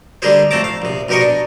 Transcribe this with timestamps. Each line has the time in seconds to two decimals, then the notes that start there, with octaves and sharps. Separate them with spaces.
0.22 D3 G3 A#3 G4 G#4 C5
0.51 F2 A3 C4 A5 A#5 D6
0.64 F5
0.82 A#1 C3
1.09 A#1 B2 G4 A#4 D#5 C#6
1.21 D4